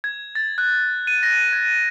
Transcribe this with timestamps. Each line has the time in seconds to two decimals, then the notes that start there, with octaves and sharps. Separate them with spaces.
0.04 G#6
0.35 A6
0.58 F#6
1.07 D#7
1.23 A#6
1.53 G#6